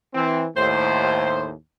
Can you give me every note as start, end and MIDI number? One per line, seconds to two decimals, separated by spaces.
0.15 0.46 52
0.15 0.46 60
0.57 1.53 39
0.57 1.53 45
0.57 1.46 72